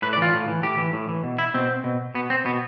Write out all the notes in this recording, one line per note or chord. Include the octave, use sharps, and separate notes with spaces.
A2 B4
D5
E3 F4
A2
E3
A2 G4
E3
A2
E3
B2
E4
B2 C4
B2
B2 B3
C4
B2 B3